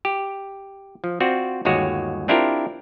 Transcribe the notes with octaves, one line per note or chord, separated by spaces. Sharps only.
G4
F3
C4 F4 F#4 D5
G1 D#2 G#3 F#4 C#5
C4 D4 E4 F4 G4 A#4